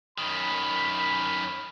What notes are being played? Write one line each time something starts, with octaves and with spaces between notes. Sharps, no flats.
F#2 D#3 B5